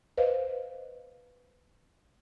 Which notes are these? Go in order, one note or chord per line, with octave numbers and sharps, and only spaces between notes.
B4 C5 D#5 F5